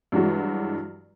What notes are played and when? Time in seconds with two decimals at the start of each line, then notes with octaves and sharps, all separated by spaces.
0.12 G2 E3 F#3 G#3 F#4